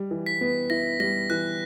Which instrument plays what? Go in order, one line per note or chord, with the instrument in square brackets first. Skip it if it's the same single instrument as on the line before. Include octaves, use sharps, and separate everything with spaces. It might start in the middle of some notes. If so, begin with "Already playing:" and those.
Already playing: [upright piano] G3
E3
[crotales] B6
[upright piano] B3
[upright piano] E4 [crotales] A#6
[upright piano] G3 [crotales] A#6
[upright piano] E3 [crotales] F#6